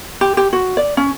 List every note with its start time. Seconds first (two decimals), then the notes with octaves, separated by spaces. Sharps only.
0.21 G4
0.37 G4
0.53 F#4
0.77 D5
0.97 C#4